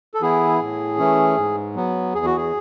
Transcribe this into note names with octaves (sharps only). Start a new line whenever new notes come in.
A4
E3 B3 E4 G#4
A2
E3 A3 C#4
G#2
F#3 B3
E2 G#4
F#4
G#4